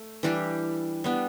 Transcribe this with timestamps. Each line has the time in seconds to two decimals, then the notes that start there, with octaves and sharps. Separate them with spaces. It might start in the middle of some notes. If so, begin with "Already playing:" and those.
Already playing: A3
0.23 E3 G3 D4 G4
1.04 G3 B3 D4